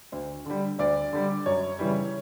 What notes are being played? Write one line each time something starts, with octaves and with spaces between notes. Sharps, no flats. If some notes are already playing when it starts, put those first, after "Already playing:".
D2
D3 G3
D2 D5
D3 G3
F#2 C#5
C#3 E3 G3